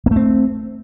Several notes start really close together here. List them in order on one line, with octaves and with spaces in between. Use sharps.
A#3 A3 C4